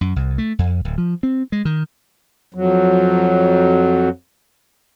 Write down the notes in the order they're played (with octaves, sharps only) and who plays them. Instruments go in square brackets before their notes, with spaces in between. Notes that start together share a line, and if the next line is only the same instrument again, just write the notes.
[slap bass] F#2
C2
A3
F2
D1
F3
C4
G#3
D#3
[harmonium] F2 F#3